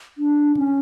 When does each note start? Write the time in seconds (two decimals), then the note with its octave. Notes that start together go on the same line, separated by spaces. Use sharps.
0.18 D4
0.57 C#4